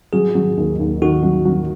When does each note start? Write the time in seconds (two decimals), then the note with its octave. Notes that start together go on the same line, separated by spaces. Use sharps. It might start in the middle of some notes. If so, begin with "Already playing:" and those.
0.13 F#3 G#4
0.35 F#3
0.57 D#2
0.80 D#2
1.02 D#3 F#4
1.23 F#3
1.45 F#3